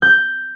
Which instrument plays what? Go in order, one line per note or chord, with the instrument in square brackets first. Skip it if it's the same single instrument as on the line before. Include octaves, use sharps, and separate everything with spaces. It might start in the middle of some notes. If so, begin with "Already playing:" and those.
[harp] G6